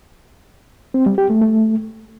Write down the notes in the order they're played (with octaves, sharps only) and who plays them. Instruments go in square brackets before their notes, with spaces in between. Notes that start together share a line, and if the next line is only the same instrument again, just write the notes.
[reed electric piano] C4
G3
G4
A3
A3